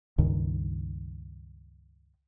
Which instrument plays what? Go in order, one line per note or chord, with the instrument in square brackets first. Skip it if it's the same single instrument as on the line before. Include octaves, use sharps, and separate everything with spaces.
[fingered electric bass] C#2 G2 D#3